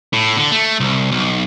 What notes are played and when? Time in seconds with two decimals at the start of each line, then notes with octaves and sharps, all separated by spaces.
0.13 A2
0.37 D3
0.51 A3
0.80 C2
1.12 B1